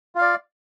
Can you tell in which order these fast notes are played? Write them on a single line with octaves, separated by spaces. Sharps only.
F4 F5 D5